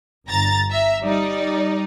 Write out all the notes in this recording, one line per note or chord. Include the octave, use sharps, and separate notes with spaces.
G1 A#5 A6
E5 A#5
G3 D#4 D5